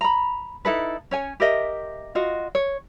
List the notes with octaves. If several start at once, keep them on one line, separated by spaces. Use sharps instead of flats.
A#5 B5
D#4 E4 A4 B4
C#4 C#5 G#5
G4 A#4 D#5 E5
F4 F#4 D#5
C#5